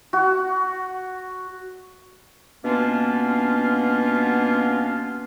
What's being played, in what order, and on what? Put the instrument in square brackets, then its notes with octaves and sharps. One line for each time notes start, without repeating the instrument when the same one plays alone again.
[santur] F#4
[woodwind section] B2 A#3 B3 C#4 D4 F4